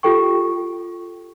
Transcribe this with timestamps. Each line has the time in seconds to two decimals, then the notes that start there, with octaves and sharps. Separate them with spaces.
0.03 F4 G4 A4 G5 C#6